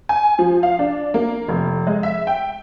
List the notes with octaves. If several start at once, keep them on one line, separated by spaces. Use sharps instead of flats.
G#5
F3
F5
D4
A#3
F1
G#3
E5
G5